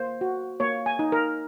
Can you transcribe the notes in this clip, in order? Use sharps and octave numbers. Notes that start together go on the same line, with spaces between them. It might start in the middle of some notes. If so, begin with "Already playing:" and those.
Already playing: A#3 C5
F#4
A#3 C#5
G#5
D#4
A#4